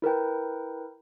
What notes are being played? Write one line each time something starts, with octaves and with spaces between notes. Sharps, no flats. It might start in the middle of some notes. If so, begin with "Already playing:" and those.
E4 A#4 B4 G5